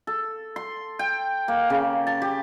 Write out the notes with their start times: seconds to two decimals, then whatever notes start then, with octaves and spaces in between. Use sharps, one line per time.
0.07 A4
0.56 C6
0.99 G5
1.48 A#3
1.70 C#3
2.07 A5
2.22 G4